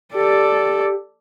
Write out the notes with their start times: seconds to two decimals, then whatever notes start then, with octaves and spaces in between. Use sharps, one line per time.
0.14 G4 A4 D5